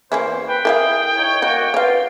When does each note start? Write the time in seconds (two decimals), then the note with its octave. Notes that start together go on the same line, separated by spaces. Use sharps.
0.12 E2 A#3 C#4 E4 C5
0.47 B4 G5
0.65 E4 G#4 A#4 E5 F5
1.17 D#4 C#5
1.42 A#3 F#4 D#5 F#5
1.74 B3 F4 C#5 F5